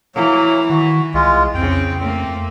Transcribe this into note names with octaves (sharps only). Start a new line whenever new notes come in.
E3 F#3 A#3
D#3 F#4
C2 G#3 F4
F2 C#3 C4 G5
A3 A#3 C4